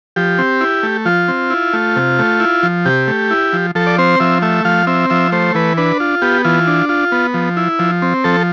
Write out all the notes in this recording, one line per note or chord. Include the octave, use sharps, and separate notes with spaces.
F3 G4
C4
E4
A3
F3 F4
C4
E4
A3
C3
A3
E4
F3
C3 G4
A3
E4
F3
F3 A4
D5
C4 C5
F3 E5
A3 E5
F3 F5
C4 E5
F3 E5
A3 C5
E3 B4
D4 B4
F4
B3 G4
E3 F4
D4
F4
B3
F3
E4
F3
C4
F3 A4